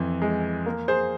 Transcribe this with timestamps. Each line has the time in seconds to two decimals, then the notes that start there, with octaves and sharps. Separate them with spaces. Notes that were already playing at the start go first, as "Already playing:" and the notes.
Already playing: F2 E3
0.22 G#3
0.66 A#3
0.88 G#4 C5